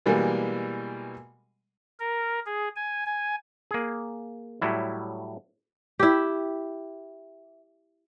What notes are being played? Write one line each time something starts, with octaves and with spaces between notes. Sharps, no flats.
B2 E3 G3 G#3 A#3
A#4
G#4
G#5
G#5
A#3 G#4
A2 F#3 G3 E4
E4 G4